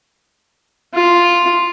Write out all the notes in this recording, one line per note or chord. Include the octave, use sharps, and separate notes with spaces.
F4